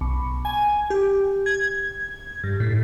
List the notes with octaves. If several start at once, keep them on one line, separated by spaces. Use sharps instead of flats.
B1
G#5
G4
G#6
G2
A2